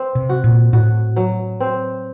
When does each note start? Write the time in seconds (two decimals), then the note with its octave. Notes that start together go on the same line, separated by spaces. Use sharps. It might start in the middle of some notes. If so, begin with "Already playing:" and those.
Already playing: C4
0.15 C3
0.29 F#4
0.44 A#2
0.73 A2 F#4
1.16 F#3
1.61 C4